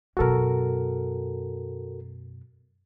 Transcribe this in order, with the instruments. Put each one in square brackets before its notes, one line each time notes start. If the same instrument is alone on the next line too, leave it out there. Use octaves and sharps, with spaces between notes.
[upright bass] F#2 B2 [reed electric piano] F#4 A4 A#4